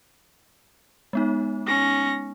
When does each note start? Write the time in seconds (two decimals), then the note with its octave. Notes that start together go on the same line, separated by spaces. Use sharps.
1.13 G#3 B3 D#4
1.67 C#4 A#6